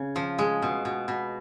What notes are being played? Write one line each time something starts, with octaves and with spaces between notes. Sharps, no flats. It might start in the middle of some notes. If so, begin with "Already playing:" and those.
Already playing: C#3
F3
G#3
B2
B2
B2